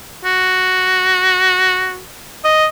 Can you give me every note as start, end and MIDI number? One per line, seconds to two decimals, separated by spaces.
0.25 2.01 66
2.44 2.66 75